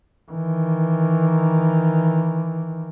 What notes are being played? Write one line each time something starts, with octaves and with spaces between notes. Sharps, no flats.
D#3 E3